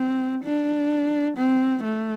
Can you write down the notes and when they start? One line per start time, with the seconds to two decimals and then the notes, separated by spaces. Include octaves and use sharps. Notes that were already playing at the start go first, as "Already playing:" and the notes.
Already playing: C4
0.44 D4
1.37 C4
1.83 A3